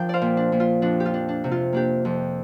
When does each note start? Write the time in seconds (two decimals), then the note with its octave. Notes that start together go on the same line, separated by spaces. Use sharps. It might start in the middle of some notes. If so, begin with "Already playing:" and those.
Already playing: F3 D4 A#4 G5
0.09 C5 D5 F5
0.22 A#2
0.37 D4
0.52 A#2
0.60 F4
0.82 F2 D4
1.00 G4
1.05 F4
1.14 D4
1.29 D4
1.44 C3
1.51 F4
1.73 A#3 D4 G4
2.05 F2